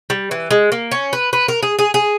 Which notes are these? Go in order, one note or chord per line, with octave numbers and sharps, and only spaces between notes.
G3
E3
G#3
A#3
C#4
B4
B4
A#4
G#4
G#4
G#4